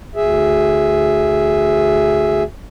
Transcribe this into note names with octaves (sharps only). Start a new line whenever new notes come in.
D2 G#4 E5